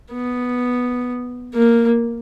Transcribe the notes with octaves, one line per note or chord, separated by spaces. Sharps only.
B3
A#3